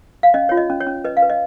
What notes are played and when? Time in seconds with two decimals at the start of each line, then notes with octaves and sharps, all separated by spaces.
0.23 F5
0.34 C#4 D#5
0.49 F4 C#5
0.57 D#5
0.70 C#4
0.81 C#5
0.87 C#4
1.04 B4 D#5
1.17 F5
1.22 B4
1.30 D#5